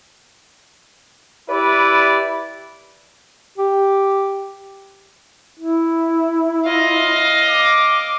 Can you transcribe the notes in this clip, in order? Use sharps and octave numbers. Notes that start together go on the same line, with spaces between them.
E4 G4 B4 D5
G4
E4
F4 D#5 F5
D6